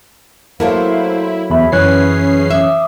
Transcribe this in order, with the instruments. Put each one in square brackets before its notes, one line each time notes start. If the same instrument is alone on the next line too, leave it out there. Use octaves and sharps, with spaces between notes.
[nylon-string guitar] F#3 A3 A#3 [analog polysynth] E4 [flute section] C5 F5
[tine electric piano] E2 B5 [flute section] G#4 E5
[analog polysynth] F#2 C#4 C7 [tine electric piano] E3 C#5 F#6 [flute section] G#4 B4
[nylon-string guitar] E5 [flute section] D6 D#6